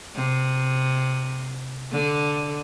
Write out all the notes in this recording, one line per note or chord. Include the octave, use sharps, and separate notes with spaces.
C3
D3